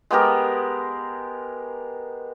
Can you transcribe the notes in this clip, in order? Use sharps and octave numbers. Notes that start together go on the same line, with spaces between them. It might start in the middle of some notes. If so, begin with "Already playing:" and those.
G#3 B3 G4 A#4